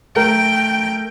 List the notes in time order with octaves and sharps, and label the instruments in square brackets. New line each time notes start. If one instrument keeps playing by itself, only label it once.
[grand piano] A3 A#4 [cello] G5